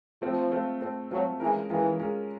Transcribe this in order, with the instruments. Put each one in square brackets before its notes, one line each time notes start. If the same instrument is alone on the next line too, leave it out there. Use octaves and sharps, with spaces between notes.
[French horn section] F3 [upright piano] A3 C4 F4
[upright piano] A3 C4 F4
A3 C4 F4
[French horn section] F#3 [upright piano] A3 C4 F4
[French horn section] E3 [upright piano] G#3 C#4 F4 A#4
[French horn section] E3 [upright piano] G#3 C#4 F4 A#4
[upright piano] G#3 C#4 F4 A#4